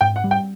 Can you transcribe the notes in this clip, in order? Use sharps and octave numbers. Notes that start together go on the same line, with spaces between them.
G#2 G5
F#5
G3
G5